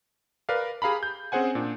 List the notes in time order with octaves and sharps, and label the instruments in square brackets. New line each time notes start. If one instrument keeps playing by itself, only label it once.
[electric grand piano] A#4 B4 D5 F5
G4 G#4 F5 A#5 B5
G6
C4 C#4 G#4 C5 F#5 G#5
A#2 D4